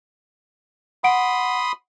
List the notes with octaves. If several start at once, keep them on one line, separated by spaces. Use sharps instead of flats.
F#5 B5 C6 D#6 D7